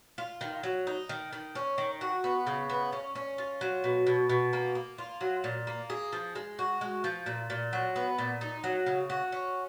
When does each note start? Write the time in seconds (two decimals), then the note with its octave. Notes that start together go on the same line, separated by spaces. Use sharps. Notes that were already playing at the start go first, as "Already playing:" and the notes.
0.18 F4
0.41 D#3
0.63 F#3
0.87 D#4
1.09 D#3
1.33 D#3
1.55 C#4
1.78 D#3
2.01 F#4
2.24 B3
2.47 C#3
2.70 B3
2.92 C#4
3.15 C#4
3.38 F4
3.61 F#3
3.84 B2
4.06 B2
4.29 B2
4.53 A#3
4.75 A#3
4.98 F4
5.21 F#3
5.44 A#2
5.67 A#3
5.90 G#4
6.13 F3
6.35 G#3
6.59 F#4
6.81 G#3
7.04 F3
7.26 A#2
7.50 A#2
7.73 F#3
7.96 B3
8.18 A#2
8.41 D#4
8.64 F#3
8.86 C#3
9.10 F#4
9.32 C#4